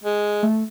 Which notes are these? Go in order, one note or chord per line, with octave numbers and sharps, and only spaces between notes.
G#3
A3